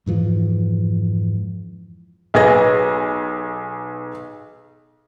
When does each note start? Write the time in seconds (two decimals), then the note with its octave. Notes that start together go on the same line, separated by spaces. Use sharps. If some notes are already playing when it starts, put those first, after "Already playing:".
0.06 F2 G#2 E3 F3
2.34 B1 G#4 B4 G#6 A#6